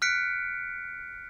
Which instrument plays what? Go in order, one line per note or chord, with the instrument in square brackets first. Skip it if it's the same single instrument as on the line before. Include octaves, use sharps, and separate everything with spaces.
[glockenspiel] F6 F#6 B6 C#7 D7